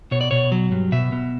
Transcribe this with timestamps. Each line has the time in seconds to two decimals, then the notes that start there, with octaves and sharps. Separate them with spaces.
0.11 B2 C#5
0.21 D5
0.31 B2 C#5
0.52 F#3
0.72 G2
0.92 B2 E5
1.12 B2